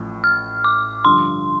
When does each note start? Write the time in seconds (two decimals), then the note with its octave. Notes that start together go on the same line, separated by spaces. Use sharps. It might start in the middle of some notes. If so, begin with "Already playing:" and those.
Already playing: A1 A2 F3
0.24 F6
0.64 D6
1.05 G2 D3 F3 C6